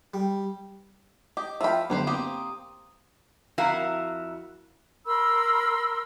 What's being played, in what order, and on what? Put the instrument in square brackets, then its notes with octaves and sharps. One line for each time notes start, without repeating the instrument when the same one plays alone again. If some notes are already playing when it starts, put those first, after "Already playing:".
[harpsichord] G3
[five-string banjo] G4 [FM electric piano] D#5
[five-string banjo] F3 B5 [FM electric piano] E5 F5 G5
[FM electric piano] F#2 D3 B3 [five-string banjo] G3 B4 C5
[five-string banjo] A#3 C4 G4 [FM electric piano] D#6
[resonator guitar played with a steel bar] F2 E4 F#4 A#4 F5 A#5
[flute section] A#4 B5 C6 E6